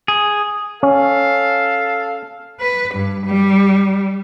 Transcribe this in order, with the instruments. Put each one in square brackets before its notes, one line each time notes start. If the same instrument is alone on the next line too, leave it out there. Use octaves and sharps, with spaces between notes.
[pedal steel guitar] G#4
[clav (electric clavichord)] C#4 [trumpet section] A4 F5
[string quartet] B4
G2
G3